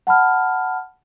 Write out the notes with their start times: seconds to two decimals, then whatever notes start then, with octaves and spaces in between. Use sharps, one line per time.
0.07 F#5 A5 B5 F6